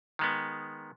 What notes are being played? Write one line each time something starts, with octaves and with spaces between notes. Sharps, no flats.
D#3 G#3 B3